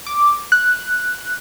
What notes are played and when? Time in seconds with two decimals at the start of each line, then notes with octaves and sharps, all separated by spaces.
0.06 D6
0.52 F#6